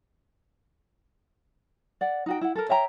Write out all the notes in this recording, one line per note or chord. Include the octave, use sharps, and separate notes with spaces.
D5 F#5
D#4 F#4 G5
E4 F#5
A4 A#4
C#5 E5 G5 A#5